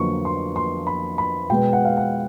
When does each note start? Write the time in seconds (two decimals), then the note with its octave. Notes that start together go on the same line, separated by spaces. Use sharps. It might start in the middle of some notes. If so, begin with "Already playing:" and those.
Already playing: F2 D3 F#3 A#3 C#6
0.25 C6
0.56 C6
0.87 B5
1.18 B5
1.50 B2 G#3 B3 G5
1.73 F#5
1.85 F5
1.97 F#5